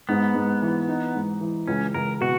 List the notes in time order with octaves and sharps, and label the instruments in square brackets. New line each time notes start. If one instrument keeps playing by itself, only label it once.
[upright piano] G#2 [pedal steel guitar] B3
[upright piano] G#2
E3
D#4
G#2
E3
[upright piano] C#2 [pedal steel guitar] C#4
[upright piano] C#2 [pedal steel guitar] A#4
[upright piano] B2 [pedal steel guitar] F#4